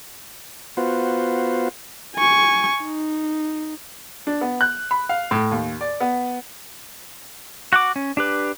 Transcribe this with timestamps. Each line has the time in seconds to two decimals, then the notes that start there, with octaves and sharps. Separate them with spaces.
0.77 B3 F4 F#4 C5
2.16 G#5 C#6
2.83 D#4
4.27 D4
4.41 B3
4.61 F#6
4.91 B5
5.09 F5
5.31 A2
5.51 D#2
5.81 D5
6.00 B3
7.73 F#4 F#5 D6
7.96 C#4
8.17 D4 G4 B4